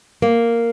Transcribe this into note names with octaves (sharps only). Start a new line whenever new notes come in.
A#3